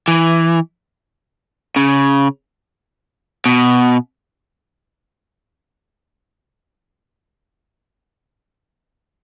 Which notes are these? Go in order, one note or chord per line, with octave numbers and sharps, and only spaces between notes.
E3
C#3
B2